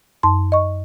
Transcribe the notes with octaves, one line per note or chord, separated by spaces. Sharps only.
F#2 A5 C6
D#5 C#6